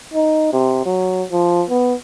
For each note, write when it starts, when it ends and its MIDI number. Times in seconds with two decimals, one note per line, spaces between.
0.14 0.50 63
0.53 0.82 48
0.85 1.24 54
1.32 1.64 53
1.69 1.94 59